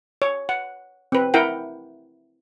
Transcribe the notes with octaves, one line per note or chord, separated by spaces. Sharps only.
C#5
F#5
C4 B4
E4 A#4 F#5 G5